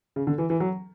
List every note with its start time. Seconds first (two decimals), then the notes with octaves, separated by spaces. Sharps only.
0.16 C#3
0.27 D3
0.38 E3
0.50 E3
0.60 F#3